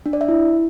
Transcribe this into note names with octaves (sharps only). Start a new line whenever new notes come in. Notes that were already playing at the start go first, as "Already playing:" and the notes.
D4
D5
E5
E4